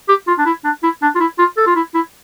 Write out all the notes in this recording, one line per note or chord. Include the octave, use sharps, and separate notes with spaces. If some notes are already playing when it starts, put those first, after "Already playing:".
G4
F4
D4
E4
D4
E4
D4
F4
E4
F4
A4
F4
E4
E4